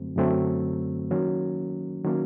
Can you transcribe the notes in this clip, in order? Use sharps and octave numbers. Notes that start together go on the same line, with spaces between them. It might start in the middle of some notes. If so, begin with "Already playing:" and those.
Already playing: F#2 D3 F#3 A3 C4
F#2 D3 F#3 A3 C4
D#3 F#3 A#3 C#4
D#3 F#3 A#3 C#4